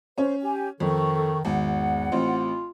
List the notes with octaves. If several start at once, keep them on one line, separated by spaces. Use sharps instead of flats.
C#4 C5 C#5
G4 G#5
F2 D#3 A4 C#6
G#1 E2 F#5
A1 C4 F4